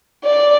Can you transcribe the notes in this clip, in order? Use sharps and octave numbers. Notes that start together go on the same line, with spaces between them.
D5